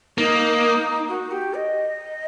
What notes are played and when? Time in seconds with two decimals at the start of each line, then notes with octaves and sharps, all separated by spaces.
0.18 A#3 D#4
1.08 F#4
1.31 G4
1.54 D#5